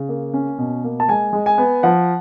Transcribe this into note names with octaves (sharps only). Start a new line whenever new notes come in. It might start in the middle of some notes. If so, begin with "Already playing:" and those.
Already playing: C#3
A#3
C#4
B2
A#3
A5
G#3 G#5
G#3
G#5
B3
F3 F#5